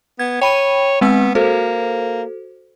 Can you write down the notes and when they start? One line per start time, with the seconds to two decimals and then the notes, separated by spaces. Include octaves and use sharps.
0.19 B3 G#6
0.42 C#5 G5 B5 D#7
1.01 G#3 B3 C4 E6
1.35 A#3 F#4 A4 C5